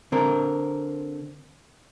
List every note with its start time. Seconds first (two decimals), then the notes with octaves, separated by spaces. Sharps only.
0.12 D3 C4 A#4